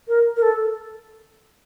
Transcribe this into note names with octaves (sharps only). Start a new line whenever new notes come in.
A#4
A#4
A4